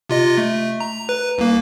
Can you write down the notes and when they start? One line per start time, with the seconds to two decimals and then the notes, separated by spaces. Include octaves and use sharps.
0.09 C3 F4 D#5
0.38 A3
0.80 A#5
1.09 B4
1.38 C2 A#3